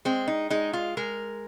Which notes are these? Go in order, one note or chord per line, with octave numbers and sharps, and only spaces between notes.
G#3 C4
D#4
G#3 D#4
F4
G#3 A#4